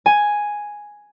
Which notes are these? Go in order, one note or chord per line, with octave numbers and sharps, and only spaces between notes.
G#5